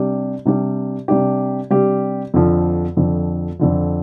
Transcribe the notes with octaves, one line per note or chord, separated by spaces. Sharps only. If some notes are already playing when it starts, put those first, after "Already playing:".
Already playing: C3 G3 D4 G4
C3 G3 D4 G4
C3 G3 D4 G4
C3 G3 D4 G4
F2 D3 F3
F2 D3 F3
F2 D3 F3